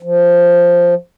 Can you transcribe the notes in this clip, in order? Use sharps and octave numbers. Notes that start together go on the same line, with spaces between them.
F3